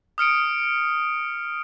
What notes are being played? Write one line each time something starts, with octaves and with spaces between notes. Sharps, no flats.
D#6 F6 C#7 D7